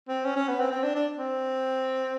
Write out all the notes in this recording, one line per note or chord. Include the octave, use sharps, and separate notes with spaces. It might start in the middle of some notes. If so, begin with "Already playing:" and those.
C4
C#4
C#4
B3
C4
C4
D4
D4
C4